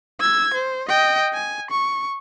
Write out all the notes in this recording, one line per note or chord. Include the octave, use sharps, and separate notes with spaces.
E6 G#6
C5
D#5 G5
G#5
C#6